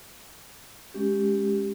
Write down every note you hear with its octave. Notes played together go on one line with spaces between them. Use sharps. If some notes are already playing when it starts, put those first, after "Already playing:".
G#3 C#4 G4